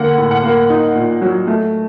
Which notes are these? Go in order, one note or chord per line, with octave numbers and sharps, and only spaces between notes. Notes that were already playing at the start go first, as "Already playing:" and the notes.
Already playing: D3 A#3 F#5
A2
F#5
A#3
D#4
A#2
F#3
A3